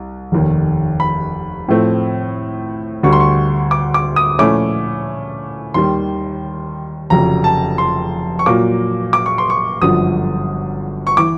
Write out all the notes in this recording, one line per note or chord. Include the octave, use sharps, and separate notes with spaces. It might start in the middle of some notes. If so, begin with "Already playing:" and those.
Already playing: C2
F1 D#2 D#3
B5
A2 F3 A3 C4
D2 D3 G3 C#6
C6
C#6
D6
D6
D#6
A#2 F3 A3 C#4 E4 D6
D#2 D#3 G3 C6
F1 F2 C#3 F#3 A#5
A5
C6
C#6
A#2 F#3 A#3 D6
D6
C#6
C6
C#6
G1 F#2 D3 F3 D#6
C#6
E3 D6